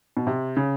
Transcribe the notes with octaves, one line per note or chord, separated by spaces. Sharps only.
B2
C3
C#3